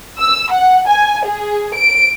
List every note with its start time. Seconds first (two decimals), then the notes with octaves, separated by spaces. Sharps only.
0.19 E6
0.52 F#5
0.88 G#5
1.26 G#4
1.76 D7